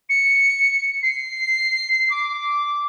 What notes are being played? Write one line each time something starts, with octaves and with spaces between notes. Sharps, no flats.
C#7
C7
D6